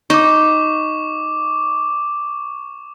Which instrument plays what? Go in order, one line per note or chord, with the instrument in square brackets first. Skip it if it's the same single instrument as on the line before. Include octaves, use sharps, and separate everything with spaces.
[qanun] D#4 [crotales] C#6 D6